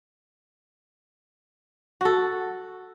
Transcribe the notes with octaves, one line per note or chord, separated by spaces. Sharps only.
F#4 A4